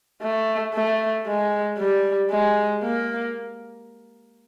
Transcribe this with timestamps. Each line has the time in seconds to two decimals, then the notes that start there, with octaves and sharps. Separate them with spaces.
0.22 A3
0.74 A3
1.26 G#3
1.78 G3
2.31 G#3
2.83 A#3